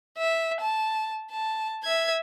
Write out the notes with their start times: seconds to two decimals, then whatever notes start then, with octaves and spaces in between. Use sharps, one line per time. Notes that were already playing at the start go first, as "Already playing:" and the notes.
0.18 E5
0.61 A5
1.32 A5
1.83 E5 G#6